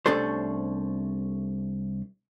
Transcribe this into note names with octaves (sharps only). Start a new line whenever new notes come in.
C2 A3 C#4 D4 A4 C5